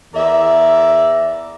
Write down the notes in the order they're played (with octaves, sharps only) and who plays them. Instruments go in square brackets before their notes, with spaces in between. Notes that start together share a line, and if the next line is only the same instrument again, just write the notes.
[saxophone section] E2 A#4 D5 E5